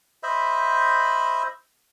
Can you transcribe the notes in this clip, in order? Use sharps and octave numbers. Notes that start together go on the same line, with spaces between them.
C5 D#5 E5 B5